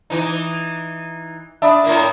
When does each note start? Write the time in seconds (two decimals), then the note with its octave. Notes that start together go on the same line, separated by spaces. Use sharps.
0.10 E3 D#4
1.62 D4 E5 B5 D#6
1.84 A2 A#3